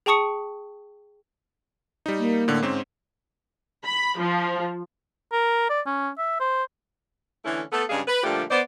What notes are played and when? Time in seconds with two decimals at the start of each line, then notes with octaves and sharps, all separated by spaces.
0.06 G#4 G5 A5 C#6 D#6 C#7
2.06 G3 D#4
2.19 A#3
2.48 A2 D3
2.62 G#2 C4 C#4
3.84 B5
4.18 F3
5.32 A#4
5.69 D5
5.86 C#4
6.18 E5
6.40 C5
7.45 D3 E3 A3 C#4 E4
7.72 A3 B3 A4
7.89 G2 C#3 G#3 D4 G#4 F5
8.07 B4
8.24 A#2 D3 F3 G3 A3 G4
8.51 B3 C5 D5